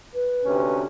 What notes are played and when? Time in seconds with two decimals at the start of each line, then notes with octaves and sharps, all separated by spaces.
0.14 B4
0.45 D2 C3 C#4